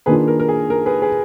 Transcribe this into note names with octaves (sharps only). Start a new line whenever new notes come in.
D#3 A#3 D4 F4 G#4 B4
A#4
A#4
G#4
A#4
G#4 B4
G#4 B4